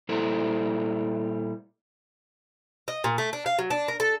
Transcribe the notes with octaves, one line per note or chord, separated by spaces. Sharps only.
A#2 G3 E4 A4 A#4 C5
D#5
A#2
A3
D4
F5
F#3
D4
A#4
A4